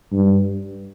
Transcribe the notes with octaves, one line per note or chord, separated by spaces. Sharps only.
G2